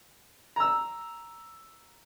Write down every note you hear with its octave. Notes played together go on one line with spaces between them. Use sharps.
A#5 E6